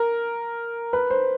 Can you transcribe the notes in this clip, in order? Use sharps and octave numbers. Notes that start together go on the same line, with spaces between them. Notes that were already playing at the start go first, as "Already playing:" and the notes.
Already playing: A#4
B4
C5